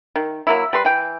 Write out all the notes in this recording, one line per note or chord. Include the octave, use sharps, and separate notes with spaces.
D#3
F#3 A#3 E4
G3 B4 C6
E3 G5